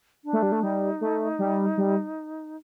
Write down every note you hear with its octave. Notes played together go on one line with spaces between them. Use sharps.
D4
A3
G3
A3
G3 D#4
A3
G3
G3